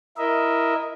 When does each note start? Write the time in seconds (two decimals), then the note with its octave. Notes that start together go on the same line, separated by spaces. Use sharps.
0.18 E4 A#4 D#5 E5